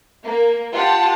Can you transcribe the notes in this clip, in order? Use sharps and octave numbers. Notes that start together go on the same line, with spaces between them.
A#3
F4 G4 F#5 A5